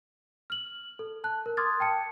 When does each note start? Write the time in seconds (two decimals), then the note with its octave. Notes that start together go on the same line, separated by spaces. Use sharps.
0.50 F6 F#7
0.99 A4
1.24 A5 F#6
1.46 A#4
1.57 C6 D6 D#6 F6 G#6 A6
1.80 G5 A5 C#7